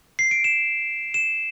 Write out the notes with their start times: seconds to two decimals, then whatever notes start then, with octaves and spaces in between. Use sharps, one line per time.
0.19 C7
0.31 D7
0.44 E7
1.14 E7